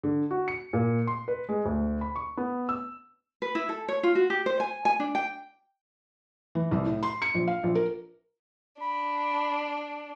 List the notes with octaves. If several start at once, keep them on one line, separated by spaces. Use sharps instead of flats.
D3
F#4
C#7
A#2
C6
B4
G#3
D2
B5
C#6
B3
E6
B4
E4
A4
C#5
F4
F#4
G4
C5
G#5
G#5
D4
G5
E3
C2
A2
C6
C#7
A#1
F5
A#1
A#4
D4 B5